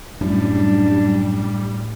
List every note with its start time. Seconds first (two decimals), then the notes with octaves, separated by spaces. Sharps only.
0.21 F#2 A2 G3 D4